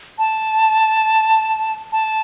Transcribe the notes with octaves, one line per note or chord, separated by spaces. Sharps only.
A5
A5